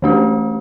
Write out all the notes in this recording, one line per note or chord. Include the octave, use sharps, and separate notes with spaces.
E3 A3 D4 G4